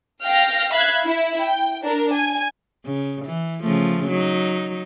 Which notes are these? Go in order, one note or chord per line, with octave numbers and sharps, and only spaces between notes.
F5 G5 F6 A#6
E5 F5 B5 F#6 G#6
E4
G5
D4 A#4
G#5
C#3
E3
C#3 F3 A3
F#3 D#4